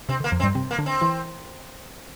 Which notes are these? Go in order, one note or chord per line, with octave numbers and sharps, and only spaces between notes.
C3 C4
D3
A#3
F2 F3
C4
G2 G3
C3 C4
A#3
D3 D4
C4
E3 E4